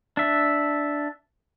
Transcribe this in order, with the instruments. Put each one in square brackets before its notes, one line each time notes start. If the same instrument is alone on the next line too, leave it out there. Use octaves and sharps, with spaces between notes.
[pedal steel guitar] D4 E5